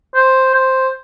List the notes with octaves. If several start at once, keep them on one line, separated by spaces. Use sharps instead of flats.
C5
C5